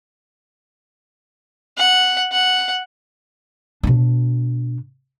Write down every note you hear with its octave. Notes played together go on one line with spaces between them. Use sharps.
F#5
F#5
B2 D4